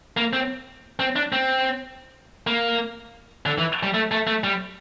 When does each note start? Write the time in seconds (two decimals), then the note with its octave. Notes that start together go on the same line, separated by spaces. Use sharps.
0.17 A#3
0.33 C4
0.99 C4
1.16 D4
1.33 C4
2.47 A#3
3.46 D3
3.58 E3
3.83 G3
3.94 A3
4.11 A3
4.27 A3
4.44 G3